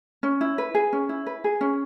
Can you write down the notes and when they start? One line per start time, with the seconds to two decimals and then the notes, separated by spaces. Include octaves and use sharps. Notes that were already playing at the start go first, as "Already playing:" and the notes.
0.23 C#4
0.41 E4
0.58 B4
0.75 G#4
0.93 C#4
1.09 E4
1.27 B4
1.44 G#4
1.61 C#4